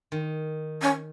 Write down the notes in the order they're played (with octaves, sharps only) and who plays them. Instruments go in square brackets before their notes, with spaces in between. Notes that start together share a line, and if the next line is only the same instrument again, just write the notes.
[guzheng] D#3
[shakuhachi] C#4